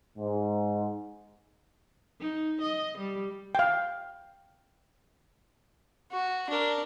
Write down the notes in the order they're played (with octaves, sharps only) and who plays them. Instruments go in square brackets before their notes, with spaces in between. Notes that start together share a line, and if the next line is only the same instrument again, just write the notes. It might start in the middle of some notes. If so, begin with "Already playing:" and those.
[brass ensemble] G#2
[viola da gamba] D#4
D#5
G3
[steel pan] F5 G5
[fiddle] F#4
D4 A#4